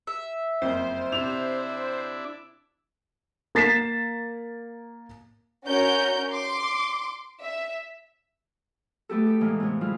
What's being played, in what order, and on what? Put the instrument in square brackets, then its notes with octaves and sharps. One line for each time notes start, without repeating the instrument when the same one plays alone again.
[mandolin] E5
[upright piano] F#1 F2 [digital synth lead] C5
[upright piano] C3 F7 [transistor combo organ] D4 E4
[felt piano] A#3 A6 B6 C7 E7
[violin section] C#4 F#4 A#4 C#5 G6
C6 D6
E5
[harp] A3 B3 G4 A4
G4
A2 E3 G#3 A#3 B3
A2 C3 B3
G3 G#3 E4 F4